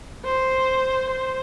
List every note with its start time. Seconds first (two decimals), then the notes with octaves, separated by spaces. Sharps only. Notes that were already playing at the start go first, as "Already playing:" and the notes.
0.24 C5
1.10 C5